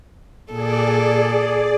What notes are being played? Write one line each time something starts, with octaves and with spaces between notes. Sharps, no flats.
A#2 G#4 A4 D5